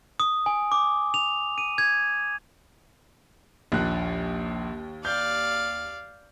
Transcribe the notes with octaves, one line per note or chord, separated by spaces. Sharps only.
D#6
G#5
D6
F7
D#7
G#6
A#1 D#2 F#6
D5 F5 G6